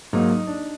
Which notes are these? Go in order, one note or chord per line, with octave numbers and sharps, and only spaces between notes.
G#2 F#3 A#3 D#4
D#4
D4